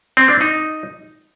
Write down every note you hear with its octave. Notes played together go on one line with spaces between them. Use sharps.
C4
D4
D#4